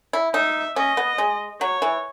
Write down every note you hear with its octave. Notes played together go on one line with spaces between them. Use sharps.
E4
D#4 E5
C#4 D#5
B3
G#3
F#3 C#5
E3